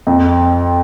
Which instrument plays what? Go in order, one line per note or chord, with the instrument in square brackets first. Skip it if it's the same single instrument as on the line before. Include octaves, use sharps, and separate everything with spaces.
[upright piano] F2